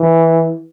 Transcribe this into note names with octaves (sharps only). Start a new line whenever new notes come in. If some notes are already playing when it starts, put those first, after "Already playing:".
Already playing: E3